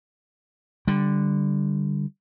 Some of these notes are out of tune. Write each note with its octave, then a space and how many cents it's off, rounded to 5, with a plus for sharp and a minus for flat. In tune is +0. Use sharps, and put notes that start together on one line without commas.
D3 +0 G3 +0